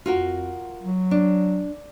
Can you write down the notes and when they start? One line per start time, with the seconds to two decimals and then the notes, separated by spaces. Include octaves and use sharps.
0.06 F2 F4 F#4 A#4
0.82 F#3
1.11 D4